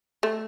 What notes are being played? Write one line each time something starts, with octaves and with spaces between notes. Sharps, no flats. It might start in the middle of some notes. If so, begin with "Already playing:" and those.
A3